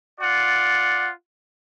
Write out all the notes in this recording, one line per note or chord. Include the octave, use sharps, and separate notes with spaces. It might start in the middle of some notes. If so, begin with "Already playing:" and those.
F4 D5 F#5